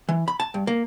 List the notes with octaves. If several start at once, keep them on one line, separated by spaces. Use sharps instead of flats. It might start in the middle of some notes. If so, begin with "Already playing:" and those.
E3
B5
A5
G2
A#3